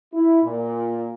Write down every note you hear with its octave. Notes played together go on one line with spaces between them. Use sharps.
E4
A#2